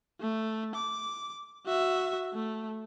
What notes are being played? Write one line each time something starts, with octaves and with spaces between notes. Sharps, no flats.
A3
D6
F#4 E5
A3